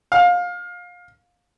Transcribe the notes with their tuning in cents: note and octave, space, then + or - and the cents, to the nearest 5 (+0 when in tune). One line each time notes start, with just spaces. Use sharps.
F5 +25